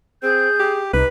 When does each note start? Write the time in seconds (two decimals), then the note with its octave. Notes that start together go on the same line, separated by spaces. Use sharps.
0.23 C4 G#4 G6
0.59 G4
0.93 C2 D#4 B4